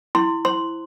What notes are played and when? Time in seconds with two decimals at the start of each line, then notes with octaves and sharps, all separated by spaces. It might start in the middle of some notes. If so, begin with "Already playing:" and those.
0.15 E4 C6
0.45 C5 C6